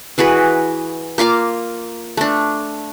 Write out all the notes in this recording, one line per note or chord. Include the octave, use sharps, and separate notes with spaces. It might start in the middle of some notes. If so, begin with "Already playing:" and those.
E3 F#4 G#4 B4
A#3 F4 F5 D6
A3 D4